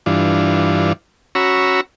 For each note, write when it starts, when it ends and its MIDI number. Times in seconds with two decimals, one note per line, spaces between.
0.06 0.93 43
0.06 0.93 52
0.06 0.93 62
0.06 0.93 65
1.35 1.81 61
1.35 1.81 66
1.35 1.81 82
1.35 1.81 83
1.35 1.81 85
1.35 1.81 88